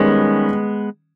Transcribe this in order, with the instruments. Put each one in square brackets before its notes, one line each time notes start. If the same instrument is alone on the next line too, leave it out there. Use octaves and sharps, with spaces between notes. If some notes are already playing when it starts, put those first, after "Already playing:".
Already playing: [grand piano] D#3 G3 C#4 [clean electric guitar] G#3 B3